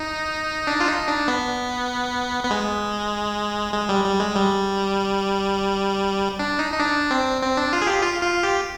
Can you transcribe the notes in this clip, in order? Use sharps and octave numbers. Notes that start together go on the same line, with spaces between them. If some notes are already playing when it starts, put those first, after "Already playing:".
Already playing: D#4
D4
F4
D#4
D4
B3
B3
G#3
G#3
G3
G3
G#3
G3
D4
D#4
D#4
D4
C4
C4
D4
F4
G#4
G4
F4
F4
G4